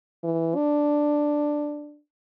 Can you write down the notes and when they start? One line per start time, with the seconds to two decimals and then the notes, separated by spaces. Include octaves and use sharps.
0.24 E3
0.56 D4